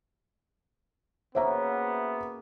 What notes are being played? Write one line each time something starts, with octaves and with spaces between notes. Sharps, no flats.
C#3 A#3 B3 F#4 C5 E5 A#5